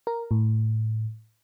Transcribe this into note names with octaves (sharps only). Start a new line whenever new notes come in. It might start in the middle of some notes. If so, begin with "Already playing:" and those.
A#4
A2